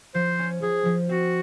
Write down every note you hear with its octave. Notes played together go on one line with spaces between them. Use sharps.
F3 C5
C#4
F3 G#4
F3
C4 F#4